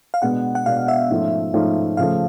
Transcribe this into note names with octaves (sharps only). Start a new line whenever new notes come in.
F5
B2 G#3 B3 D4 F#5
F#5
B2 G#3 B3 D4 F5
E5
G#2 F3 A3 C#4 F4
G#2 F3 A3 C#4 F4
C#3 F3 A3 F5